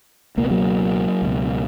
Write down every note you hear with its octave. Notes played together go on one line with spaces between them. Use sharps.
C#2 B2 A#3
B3
F#3 A#3
C#2 B2